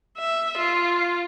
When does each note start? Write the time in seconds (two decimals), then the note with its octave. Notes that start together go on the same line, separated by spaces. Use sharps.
0.18 E5
0.58 F4